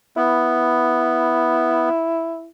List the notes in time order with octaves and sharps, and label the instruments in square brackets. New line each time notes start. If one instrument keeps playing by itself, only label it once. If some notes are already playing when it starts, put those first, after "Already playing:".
[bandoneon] B3 [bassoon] E4